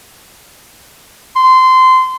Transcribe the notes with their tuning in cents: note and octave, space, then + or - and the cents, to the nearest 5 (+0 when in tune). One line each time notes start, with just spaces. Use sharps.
C6 -20